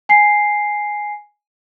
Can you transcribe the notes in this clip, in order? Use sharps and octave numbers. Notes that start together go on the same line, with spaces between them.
G#5 C7